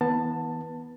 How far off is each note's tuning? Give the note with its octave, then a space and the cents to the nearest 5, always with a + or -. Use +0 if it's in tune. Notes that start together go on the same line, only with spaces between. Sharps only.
E3 -40 B3 -15 A5 +10